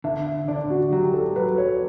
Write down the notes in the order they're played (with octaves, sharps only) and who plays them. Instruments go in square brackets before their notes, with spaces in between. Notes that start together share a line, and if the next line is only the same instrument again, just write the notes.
[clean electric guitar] D3 [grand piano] E5
[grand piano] E5
[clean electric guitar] D3 [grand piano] D5
[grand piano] F#4
[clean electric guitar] F#3 [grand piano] G4
[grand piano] A4
[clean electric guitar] F#3 [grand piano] B4
[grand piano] C#5